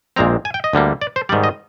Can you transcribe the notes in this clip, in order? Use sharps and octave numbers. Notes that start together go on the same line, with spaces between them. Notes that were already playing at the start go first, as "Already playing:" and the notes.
A#1 A#2 G#3 C4 A#5
G#5
G5
D#5
D2 D3 G3 A#3
D5
C5
G#2 D#3 G3 D5
D#5